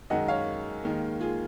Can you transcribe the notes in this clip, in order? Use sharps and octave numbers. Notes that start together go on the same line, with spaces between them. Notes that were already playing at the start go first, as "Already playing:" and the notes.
F#2 D#3 G#3 D#5 F#5
C#5 F5
D#2 D#3 G#3
F4 G#4